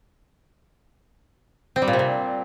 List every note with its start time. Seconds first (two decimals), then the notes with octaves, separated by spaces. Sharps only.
1.76 C4
1.82 G3
1.88 A#2
1.93 C3
1.99 A#2